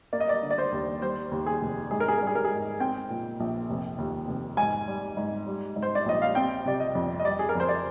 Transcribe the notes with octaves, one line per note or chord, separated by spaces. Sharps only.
A#3 D5
D#5
D5
D3
D5
C5
D#2
G3 C5
D#2
G#4
F1
G#2 G#4
A#4
G#4
G3 A#4
G#4
A#4
G#4
G#2
C4 G5
A#2
A#1
F1
D#2
F1
G#2 G#5
G3
G#2
G3
G#2
C5
D5
A#1 D#5
F5
C4 G5
C3 D5
D#5
F2
D#5
G3 D5
G#4
A#4
F2
C5
D5